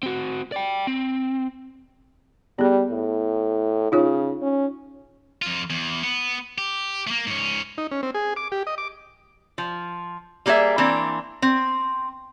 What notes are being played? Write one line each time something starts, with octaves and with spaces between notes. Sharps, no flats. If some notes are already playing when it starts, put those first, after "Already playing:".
C4 F#4
D5 G5
C4
G3 B3 G#4
A2
C#3 D#4 F4 C#5
C#4
F2 F4
E2
B3
G4
A3 A#3
G#2 C#4
D#4
C#4
C4
G#4
D6
G4
D#5
D6
F3
G3 A#3 G#4 C#5 E5
E3 A#3 C4 D4
C4